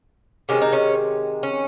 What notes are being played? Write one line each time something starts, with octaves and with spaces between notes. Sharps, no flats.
C3 D#3 G#3 C#4
D#4
C#4
C#4